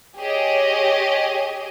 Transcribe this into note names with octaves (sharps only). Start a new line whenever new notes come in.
G4 G#4 C#5 D#5